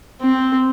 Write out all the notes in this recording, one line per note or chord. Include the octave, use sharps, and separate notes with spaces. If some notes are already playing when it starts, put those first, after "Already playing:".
C4